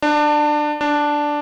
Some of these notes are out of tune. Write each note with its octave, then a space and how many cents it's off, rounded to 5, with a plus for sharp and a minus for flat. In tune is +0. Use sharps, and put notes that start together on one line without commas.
D4 +20
D4 +0